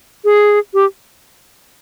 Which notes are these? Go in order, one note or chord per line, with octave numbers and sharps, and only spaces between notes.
G#4
G4